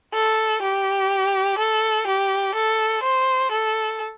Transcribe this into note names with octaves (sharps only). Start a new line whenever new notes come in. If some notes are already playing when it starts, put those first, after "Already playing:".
A4
G4
A4
G4
A4
C5
A4